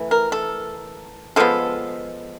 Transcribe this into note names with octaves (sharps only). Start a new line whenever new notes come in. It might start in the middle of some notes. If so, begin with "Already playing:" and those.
Already playing: E3 A3
A#4
A4
D3 F3 G#3 B3 A4